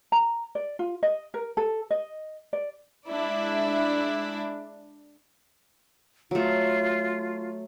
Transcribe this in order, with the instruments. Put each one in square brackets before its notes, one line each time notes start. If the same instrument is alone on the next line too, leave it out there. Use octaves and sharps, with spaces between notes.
[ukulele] A#5
D5
F4
D#5
A#4
A4
D#5
D5
[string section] G#3 D4 E4 D5
[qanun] F#3 A3 [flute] F4